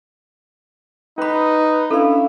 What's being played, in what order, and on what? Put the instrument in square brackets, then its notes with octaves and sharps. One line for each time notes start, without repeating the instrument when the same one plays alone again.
[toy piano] C#4 B5 [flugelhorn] D#4 [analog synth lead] B4
[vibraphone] C#4 D4 F5 [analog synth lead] E4 [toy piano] A4